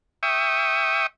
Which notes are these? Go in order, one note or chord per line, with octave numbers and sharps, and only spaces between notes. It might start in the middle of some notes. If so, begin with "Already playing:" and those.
E5 G5 C#6 D#6